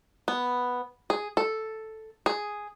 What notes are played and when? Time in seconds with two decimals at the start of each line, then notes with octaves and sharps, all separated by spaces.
0.28 B3
1.10 G#4
1.37 A4
2.26 G#4